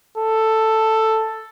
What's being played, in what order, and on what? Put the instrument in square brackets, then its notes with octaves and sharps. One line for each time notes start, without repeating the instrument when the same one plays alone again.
[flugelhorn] A4